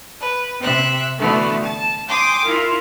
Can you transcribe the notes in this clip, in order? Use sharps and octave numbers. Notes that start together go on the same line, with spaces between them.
B4
C3 E5 F#6
D3 E3 A3 B3 F#4
A5
G5 G#5 C6 D6 D#6
E4 F4 A#4